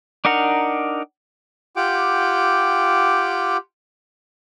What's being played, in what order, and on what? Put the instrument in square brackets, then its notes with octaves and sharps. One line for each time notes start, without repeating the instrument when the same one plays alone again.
[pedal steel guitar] D4 D#4 A#4 F#5 A#5
[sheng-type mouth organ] F4 G4 F#5 G5 D6